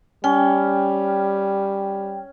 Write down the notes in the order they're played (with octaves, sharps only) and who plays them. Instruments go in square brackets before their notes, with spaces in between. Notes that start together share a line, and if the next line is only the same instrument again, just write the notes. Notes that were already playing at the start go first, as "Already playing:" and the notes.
[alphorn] G3 [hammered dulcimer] C#4 [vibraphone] G5